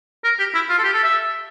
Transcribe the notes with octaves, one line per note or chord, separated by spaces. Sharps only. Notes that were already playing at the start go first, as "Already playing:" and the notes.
A#4
G4
E4
F4
A4
G4
A4
E5